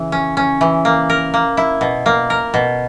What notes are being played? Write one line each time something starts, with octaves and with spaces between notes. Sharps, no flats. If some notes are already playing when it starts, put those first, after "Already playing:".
Already playing: C#3 E3
C#4
C#4
E3
A#3
A#4
A#3
E4
B2
A#3
A#4
B2